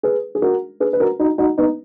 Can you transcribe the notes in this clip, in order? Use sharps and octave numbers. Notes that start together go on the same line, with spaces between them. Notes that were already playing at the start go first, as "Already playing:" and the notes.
G#4 B4
G#4
F#4 A#4
G#4 B4
B4
F#4 A#4
D#4 F#4
D#4 F#4
B3 D#4